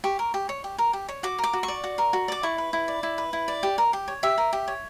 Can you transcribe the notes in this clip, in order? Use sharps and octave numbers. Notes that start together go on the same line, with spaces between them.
G4 C#6
A#4
G4
C#5
G4
A#4
G4
C#5
F#4 D6
A#4
D6
F#4
C#6
D5
F#4
A#4
F#4
D5 D6
E4 C#6
B4
E4
D5
E4
B4
E4
D5
G4
A#4
G4
C#5
G4 E5
A#4
G4
C#5